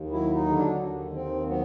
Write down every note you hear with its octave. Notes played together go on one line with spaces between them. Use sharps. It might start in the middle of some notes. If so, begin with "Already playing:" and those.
Already playing: D#2
F#3 E4
D#4
D3
D4
D#2
D#2 C4
F#3 B3